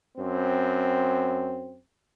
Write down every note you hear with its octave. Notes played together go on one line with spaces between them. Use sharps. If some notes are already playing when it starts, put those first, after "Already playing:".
F#2 C4